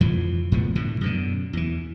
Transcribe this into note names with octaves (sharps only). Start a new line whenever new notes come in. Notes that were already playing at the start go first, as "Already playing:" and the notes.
F2 E3 F3
G#2 F3 B3
A2 D3 E3
F#2 B2 D3
E2 E3